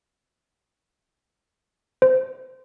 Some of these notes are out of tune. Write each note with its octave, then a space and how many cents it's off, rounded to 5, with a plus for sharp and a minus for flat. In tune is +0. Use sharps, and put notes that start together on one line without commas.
C5 -20